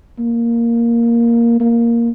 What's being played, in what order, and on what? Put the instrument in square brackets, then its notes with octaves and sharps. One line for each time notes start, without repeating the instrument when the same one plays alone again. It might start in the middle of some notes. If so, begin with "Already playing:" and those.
[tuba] A#3
A#3